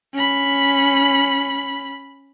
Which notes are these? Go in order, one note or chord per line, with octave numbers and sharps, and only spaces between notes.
C#4 B5